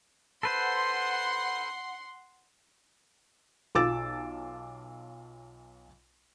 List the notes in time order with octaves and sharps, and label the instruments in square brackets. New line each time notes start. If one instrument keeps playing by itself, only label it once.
[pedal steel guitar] A4 B4 C5 [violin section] F#5 C6
[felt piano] B1 F4 D6 E6 A6